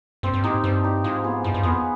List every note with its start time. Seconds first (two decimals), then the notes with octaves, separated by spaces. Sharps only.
0.23 G2 C4
0.34 G2
0.44 G#2 D#4 G4
0.64 G2 C4
0.84 D#4 G4
1.04 G#2 F3
1.23 B3 F4 G#4
1.44 G2 F3
1.54 G2
1.63 F2 B3 F4 G#4